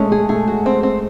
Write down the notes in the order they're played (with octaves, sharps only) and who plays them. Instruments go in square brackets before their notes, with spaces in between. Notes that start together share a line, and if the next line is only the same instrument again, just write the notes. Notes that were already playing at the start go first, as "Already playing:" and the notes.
Already playing: [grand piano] G#3 A3 [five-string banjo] C#4
[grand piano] A3 [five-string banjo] G#4
[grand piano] A3 [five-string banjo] G#4
[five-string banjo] F#4
C4
C4